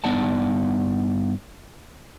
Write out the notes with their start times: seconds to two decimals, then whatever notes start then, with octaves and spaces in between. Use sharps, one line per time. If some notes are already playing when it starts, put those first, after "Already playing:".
0.04 G2 B3 D#4 D5 F#5 A5